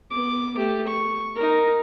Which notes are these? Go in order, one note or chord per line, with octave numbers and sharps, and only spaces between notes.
B3 D6
A3 G4
C#6
D#4 A#4